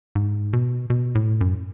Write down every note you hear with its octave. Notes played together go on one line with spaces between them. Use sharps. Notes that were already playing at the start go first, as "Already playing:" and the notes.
G#2
B2
B2
A2
F#2